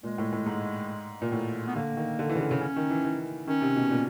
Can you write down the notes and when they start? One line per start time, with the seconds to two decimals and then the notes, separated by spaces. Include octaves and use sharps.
0.03 A#2 G#3
0.18 A2
0.32 A2
0.46 G#2
1.22 A#2
1.32 A2
1.67 B3
1.76 D3 A#3
1.97 D#3
2.19 D3
2.29 E3
2.35 C#3
2.40 D3
2.51 C#3
2.61 C#4
2.76 D#3
2.90 E3
3.04 E3
3.47 D#3 C#4
3.61 C3
3.77 B2
3.91 A#2